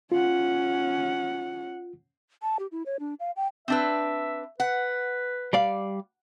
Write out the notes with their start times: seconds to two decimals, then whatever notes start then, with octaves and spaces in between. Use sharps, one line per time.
0.12 C#4 F4 F#5
2.42 A5
2.59 G4
2.72 E4
2.86 C#5
3.00 D4
3.20 F5
3.36 G5
3.68 C4 D4 B4 E5
4.60 B4 F#5
5.53 G3 D5 F5